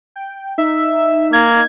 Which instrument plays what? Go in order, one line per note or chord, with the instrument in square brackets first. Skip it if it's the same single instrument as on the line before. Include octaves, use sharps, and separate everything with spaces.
[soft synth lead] G5
[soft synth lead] D#4 [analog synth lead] E5
[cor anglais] A#3 [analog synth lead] G#6